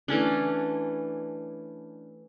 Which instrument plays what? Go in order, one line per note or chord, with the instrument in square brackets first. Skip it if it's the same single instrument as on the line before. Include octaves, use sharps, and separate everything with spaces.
[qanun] E3 A3 C#4 D4